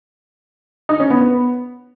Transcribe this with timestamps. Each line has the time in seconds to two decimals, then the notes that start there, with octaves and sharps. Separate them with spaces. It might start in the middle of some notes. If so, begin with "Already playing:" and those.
0.89 D#4
1.00 C#4
1.10 B3
1.21 B3